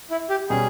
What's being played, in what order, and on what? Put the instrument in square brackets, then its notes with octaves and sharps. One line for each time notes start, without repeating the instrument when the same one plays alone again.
[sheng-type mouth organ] E4
G4
[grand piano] B2 G3 C#4 [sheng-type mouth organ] G#4